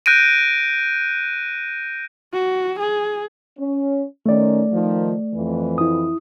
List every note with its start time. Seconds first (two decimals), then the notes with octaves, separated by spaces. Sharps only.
0.06 F#6 G6 A#6 D7 D#7
2.33 F#4
2.79 G#4
3.58 C#4
4.26 D#3 A3 C#4 D5
4.71 D#3 F3
5.34 F2 E3
5.78 E4 D#6